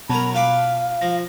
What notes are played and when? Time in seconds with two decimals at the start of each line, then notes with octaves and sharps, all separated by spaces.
0.10 B2 F#3 C#4 A#4 A5 B5
0.35 F4 B4 F5 D6
1.01 F3 A#6